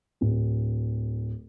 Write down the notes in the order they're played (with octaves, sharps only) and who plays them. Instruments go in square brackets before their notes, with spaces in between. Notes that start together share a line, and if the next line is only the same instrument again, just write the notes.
[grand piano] D1